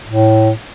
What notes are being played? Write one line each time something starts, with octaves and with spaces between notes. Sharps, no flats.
A2